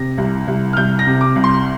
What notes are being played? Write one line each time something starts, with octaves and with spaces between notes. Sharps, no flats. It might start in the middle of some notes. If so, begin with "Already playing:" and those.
Already playing: C3 A#6
C2
C2
F6
C2 G6
A#6
C3
D6
C2
C6